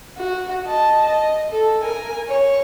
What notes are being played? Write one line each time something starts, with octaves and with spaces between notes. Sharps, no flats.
F#4
D#5 A5
D#5
A4
A#4 G#5
C#5